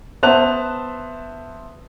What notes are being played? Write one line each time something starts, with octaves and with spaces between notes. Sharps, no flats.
B3 C5 E5 A5 F#6 F7